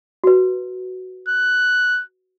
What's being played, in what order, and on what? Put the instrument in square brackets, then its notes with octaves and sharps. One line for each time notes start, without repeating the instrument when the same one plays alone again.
[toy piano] F#4 B4
[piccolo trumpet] F#6